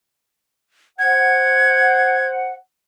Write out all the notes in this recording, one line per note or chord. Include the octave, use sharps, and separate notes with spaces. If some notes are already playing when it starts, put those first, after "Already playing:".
C5 F#5 G#6